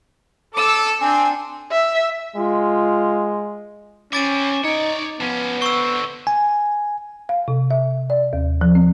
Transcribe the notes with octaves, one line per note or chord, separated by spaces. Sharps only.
A4 D6 E6
C4 D4 G#5
E5
G#3 F4
C4 C#4 E4 D6 A6 D#7
D#4 C#5 D5
F3 B3 C#4
D3 C4 C#6 E6
G#5
F5
C3
E5
D5
D#2
F3
C4